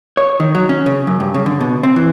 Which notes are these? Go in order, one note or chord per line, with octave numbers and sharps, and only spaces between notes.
C#5
D#3
F#3
C#4
C#3
F#2
G2
C#3
D3
B2
C4
E3